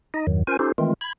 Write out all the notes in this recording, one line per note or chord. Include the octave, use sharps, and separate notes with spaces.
D#4 D#5
E2 G2 D#3 F#3
C#4 F4 A#4 C5 G#5
C#4 D#4 F4 G4 A4 C5
D#3 E3 G#3 A3 C4 F4
B5 G#6